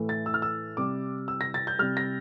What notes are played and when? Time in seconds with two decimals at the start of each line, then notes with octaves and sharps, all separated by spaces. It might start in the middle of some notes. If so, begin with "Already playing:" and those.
Already playing: A2 E3 A3
0.09 A6
0.26 E6
0.34 F6
0.42 E6
0.77 C3 G3 D6
1.28 E6
1.41 A#6
1.54 A6
1.67 G6
1.79 C3 G3 F6
1.97 A#6